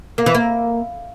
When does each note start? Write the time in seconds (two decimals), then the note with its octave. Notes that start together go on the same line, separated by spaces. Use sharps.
0.18 A#3
0.26 E3
0.35 A#3